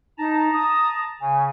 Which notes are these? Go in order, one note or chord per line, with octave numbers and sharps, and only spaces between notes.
D#4 A5 A#5
D#6
C#3 G#5